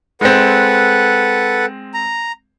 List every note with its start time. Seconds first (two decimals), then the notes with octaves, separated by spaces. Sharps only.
0.21 G#3 C4 A4 B4 F#5
1.94 A#5